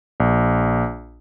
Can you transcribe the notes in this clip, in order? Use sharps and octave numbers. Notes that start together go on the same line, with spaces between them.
A#1